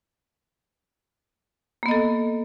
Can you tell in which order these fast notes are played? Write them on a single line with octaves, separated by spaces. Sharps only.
A#3 B3 D#5 A4